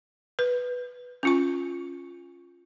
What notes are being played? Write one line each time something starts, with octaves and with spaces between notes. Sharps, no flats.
B4
C#4 F4 C#6